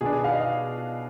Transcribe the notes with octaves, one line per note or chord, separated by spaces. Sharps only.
B2 B3 D4 G#4
G#4
F5
D#5
F5